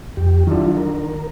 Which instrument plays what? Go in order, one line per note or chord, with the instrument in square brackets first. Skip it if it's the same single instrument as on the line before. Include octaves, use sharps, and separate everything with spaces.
[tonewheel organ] F2 G4
[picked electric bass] D#3 D4 [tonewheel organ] F#3 E4 F4
[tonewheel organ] A#4